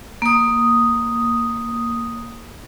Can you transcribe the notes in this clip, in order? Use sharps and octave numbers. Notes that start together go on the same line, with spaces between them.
A#3 D#6